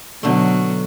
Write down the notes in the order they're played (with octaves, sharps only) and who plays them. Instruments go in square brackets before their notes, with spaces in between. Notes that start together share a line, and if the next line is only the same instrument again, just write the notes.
[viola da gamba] B2 F#3 [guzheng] D3 A3